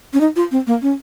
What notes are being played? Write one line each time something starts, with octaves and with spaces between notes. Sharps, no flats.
C#4
D#4
F4
C4
A#3
C#4